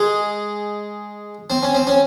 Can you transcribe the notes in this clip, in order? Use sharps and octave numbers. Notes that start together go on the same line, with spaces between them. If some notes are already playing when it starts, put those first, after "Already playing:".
Already playing: G#3
C4
C#4
C4
C#4